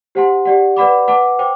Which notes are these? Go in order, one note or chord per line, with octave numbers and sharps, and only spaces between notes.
G4 C5 F#5 A5 C6
G4 D5 F#5
B4 D5 F#5 B5 D6
B4 F#5 A5 D6
C5 G5 D6